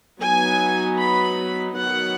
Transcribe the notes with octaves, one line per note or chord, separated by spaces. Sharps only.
F#3 B3 D#4 G#5
B5
D#3 F#3 B3 F#5